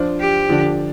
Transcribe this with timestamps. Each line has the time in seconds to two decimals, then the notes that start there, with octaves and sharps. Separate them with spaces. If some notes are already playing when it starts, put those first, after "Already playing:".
Already playing: F3 D4 F4 C5
0.20 G4
0.49 D3 F3 D4